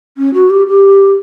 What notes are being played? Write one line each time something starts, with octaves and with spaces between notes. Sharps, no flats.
C#4
F#4
G4
G4